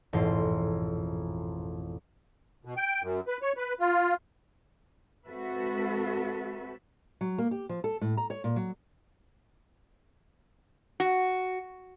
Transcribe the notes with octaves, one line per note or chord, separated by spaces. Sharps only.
A1 F2 G#2 B2 C6
B2
G5
F#2
B4
C#5
B4
F4
G#3 C4 F#4 A4 B4 E5
F#3
A#3
G4
F3
A4
A2
A#5
C#5
A#2
F#3
F#4